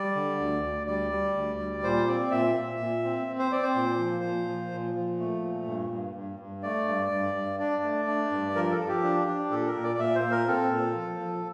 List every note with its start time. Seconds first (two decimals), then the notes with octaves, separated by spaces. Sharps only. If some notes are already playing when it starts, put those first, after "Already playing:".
Already playing: G3 D5
0.15 D3
0.40 D2
0.63 D2
0.87 G3 D5
1.12 G3
1.35 D2
1.60 G3
1.83 A#2 C5
2.07 C4 D5
2.31 A#2 E5
2.56 A#2
2.80 A#2
3.04 C4
3.28 C4
3.39 C5
3.51 C4 D5
3.63 C5
3.75 A#2
3.99 F3
4.24 A#2
4.47 F3
4.71 A#2
4.95 F3
5.19 A3
5.43 A#2
5.67 G2
5.91 G2
6.15 G2
6.40 G2
6.63 A3 D5
6.88 G2
7.12 G2
7.35 G2
7.60 D4 D5
7.83 A3
8.08 D4
8.32 G2
8.55 F3 A#4
8.71 A4
8.79 F3
8.88 G4
9.04 D4
9.28 D4
9.51 A#2 A4
9.67 A#4
9.75 A#2
9.83 D5
9.99 A#2 E5
10.15 C5
10.23 A#2
10.31 A#4
10.47 C4 A4
10.71 A#2
10.95 F3
11.20 F3